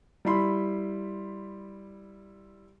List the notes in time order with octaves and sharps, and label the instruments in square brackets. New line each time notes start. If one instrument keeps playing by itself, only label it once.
[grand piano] G3 E4 B5 C6